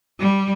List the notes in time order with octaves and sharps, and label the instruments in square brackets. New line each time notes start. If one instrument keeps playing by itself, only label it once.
[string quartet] G3